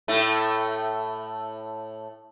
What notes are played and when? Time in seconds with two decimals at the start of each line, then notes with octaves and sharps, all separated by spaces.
0.08 A2 A3